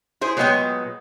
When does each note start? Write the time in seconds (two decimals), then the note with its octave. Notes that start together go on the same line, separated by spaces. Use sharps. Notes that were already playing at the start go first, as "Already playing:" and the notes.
0.21 E4 G#4 C5
0.37 A#2 F#3 G#3 B3 D#5 G5